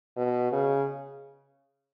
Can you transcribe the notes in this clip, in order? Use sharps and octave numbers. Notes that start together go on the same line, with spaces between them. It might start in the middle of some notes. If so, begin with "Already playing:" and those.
B2
C#3